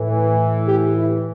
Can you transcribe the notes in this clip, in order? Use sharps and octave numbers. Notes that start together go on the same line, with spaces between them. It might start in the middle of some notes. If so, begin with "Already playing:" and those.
Already playing: A2 E3
G4
E4